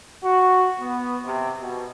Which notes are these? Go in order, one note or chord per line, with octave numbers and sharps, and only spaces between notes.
F#4
B3
C3
B2